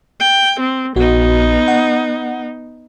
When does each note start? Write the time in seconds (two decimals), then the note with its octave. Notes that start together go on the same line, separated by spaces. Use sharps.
0.20 G5
0.60 C4
0.96 A#1 B3 D#4 F#4
1.68 F#5